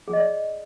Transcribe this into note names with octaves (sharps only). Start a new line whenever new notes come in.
G#4
D#5
D5